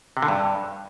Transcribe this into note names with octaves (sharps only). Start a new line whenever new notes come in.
C3
D3
G2